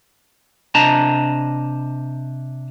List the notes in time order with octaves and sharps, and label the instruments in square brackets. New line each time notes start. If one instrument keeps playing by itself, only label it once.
[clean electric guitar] C3 D4 C5 D#5 A5 A#5